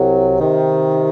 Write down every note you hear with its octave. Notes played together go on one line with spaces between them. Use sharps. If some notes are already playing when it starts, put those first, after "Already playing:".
Already playing: C2 C3 F#3
C3 D#3